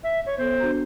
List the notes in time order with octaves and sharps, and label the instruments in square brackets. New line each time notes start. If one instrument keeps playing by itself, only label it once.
[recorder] E5
C#5
[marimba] B3 A4 [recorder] C5
[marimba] D4 F#4 A#5